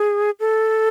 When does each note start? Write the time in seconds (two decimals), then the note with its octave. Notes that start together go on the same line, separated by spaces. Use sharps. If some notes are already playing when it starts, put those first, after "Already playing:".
Already playing: G#4
0.40 A4